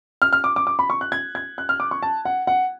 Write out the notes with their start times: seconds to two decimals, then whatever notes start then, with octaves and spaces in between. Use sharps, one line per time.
0.22 F6
0.33 F6
0.44 D6
0.56 D6
0.67 D6
0.79 B5
0.90 C#6
1.01 F#6
1.12 G#6
1.35 G#6
1.58 F#6
1.69 F6
1.80 D6
1.91 C#6
2.03 A5
2.25 F#5
2.47 F#5